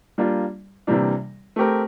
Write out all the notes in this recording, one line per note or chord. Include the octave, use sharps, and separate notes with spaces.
G3 A#3 D4 F4
C3 E3 G3 A#3 D4
A3 C4 G4 A#4